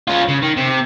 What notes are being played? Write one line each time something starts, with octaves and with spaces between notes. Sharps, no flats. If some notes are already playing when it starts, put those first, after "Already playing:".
C#4 F4
C#3
D#3
C3